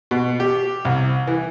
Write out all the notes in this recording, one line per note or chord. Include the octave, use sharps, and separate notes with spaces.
B2
G4
C2
E3